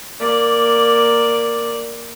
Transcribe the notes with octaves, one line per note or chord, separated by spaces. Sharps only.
A#3 D5